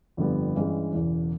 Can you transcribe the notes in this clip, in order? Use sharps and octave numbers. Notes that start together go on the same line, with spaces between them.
G1 F2 D3 G3 B3
G2 E3 G#3 C#4
E1 E2 C#3 E3